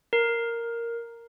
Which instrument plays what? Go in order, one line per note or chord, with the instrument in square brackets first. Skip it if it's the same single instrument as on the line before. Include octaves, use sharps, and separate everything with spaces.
[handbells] A#4